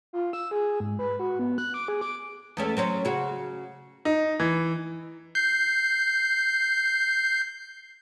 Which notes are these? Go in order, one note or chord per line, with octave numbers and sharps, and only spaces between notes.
F4
E6
G#4
G#2
B4
F#4
B3
F#6
D6
G#4
D6
E2 A3 C#4
F#3 C4 C#4
C#3 F#4
D#4
E3
G6 C7